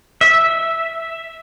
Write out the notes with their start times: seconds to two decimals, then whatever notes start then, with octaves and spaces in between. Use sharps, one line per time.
0.21 E5